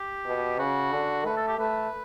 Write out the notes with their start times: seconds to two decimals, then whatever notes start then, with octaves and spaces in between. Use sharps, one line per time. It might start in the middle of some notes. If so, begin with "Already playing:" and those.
Already playing: G4
0.26 B2
0.59 C#3 F#4
0.93 D3
1.26 A3 B4
1.37 A4
1.48 G4
1.59 A3 B4